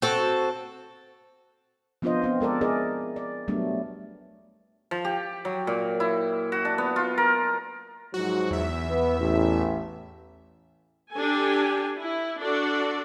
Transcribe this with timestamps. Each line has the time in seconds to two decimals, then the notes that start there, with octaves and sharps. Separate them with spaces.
0.02 C4 F#4 A4
2.02 F3 B3 D4 F4 C5 D#5
2.22 B3 C4 F4
2.41 G#3 A4 A#4 D5
2.61 E4 G#4 A#4 D5 D#5
3.16 D5
3.48 F#3 G3 A3 B3 D4
4.91 F3
5.05 G4
5.45 F#3
5.67 A#2
6.00 E4
6.52 F#4
6.65 D4
6.78 B3
6.96 F4
7.18 A#4
8.14 G#2 F3 F#3 F#4
8.50 E2 E5
8.88 B3
9.20 A1
11.13 D4 G4 A4 G#5
12.00 E4
12.41 D4 F#4 A4 D5